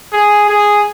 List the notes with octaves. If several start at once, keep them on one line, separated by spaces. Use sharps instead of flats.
G#4
G#4